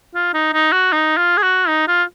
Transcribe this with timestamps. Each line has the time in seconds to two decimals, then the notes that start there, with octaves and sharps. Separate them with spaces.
0.15 F4
0.34 D#4
0.53 D#4
0.72 F#4
0.92 D#4
1.18 F4
1.37 G#4
1.43 F#4
1.68 D#4
1.88 F4